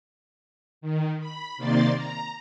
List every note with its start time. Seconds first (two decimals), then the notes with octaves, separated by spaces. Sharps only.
0.81 D#3
1.19 B5
1.57 C3 D#3 A#3 D5 C6 A6
1.95 A#5